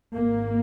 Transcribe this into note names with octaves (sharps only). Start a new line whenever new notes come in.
G#1 G#2 A#3